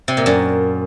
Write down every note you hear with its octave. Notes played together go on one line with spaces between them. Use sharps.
C3
A#2
F#2